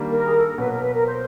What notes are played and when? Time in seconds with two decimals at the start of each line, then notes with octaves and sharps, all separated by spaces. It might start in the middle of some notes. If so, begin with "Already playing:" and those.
Already playing: D#3 G3 A#3 D4
0.10 A#4
0.24 G#4
0.36 A4
0.47 A#4
0.58 B2 F#3 A#3 B4
0.71 A#4
0.82 B4
0.94 A#4
1.06 C5